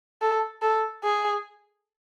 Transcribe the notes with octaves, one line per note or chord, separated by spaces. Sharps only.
A4
A4
G#4